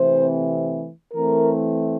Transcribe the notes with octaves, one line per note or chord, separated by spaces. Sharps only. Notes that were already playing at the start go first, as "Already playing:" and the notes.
Already playing: C3 E3 A3 C4 C5
E3 A3 C4 A#4